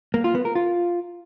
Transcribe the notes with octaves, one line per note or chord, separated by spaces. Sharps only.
A#3
F4
B3
A#4
F4